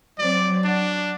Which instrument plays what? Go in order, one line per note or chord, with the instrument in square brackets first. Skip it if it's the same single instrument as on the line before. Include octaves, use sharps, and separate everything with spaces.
[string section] F#3 C4 [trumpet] D5
[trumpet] D4 [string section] F#4